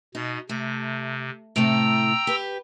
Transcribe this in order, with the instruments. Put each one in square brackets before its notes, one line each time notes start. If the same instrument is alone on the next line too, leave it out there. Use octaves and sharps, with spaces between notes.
[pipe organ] B2 [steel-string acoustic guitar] D#4
[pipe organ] C3 [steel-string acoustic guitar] A3
[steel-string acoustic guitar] A2 C3 A3 [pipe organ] G5 A#5 E6
[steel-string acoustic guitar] G4 B4